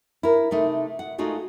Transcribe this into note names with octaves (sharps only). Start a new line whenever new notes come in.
E4 A#4
C3 A3 D#4
F#5
G#3 A3 D#4 F4 F#4 G#4